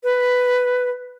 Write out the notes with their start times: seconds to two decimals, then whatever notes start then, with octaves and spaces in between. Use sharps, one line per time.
0.04 B4